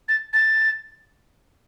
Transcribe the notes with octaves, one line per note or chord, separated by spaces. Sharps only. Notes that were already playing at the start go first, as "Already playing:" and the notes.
A6
A6